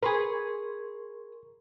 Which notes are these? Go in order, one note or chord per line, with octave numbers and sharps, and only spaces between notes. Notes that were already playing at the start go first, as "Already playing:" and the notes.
G#4 A#4 B4 C6 C#6